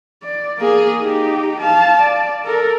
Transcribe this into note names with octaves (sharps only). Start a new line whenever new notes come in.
D5
A#3 G#4
D#4 G4
F5 A5
D5
A4 A#4